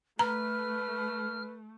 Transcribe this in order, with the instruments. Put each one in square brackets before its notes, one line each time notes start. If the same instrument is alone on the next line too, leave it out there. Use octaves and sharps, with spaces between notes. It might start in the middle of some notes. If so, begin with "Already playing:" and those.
[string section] A3 [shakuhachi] B4 [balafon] A#5 [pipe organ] F6